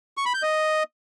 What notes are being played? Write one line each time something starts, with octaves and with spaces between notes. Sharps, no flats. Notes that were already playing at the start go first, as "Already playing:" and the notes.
C#6
B5
G6
D#5